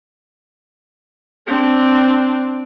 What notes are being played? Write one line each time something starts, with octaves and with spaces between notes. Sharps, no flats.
C4 D4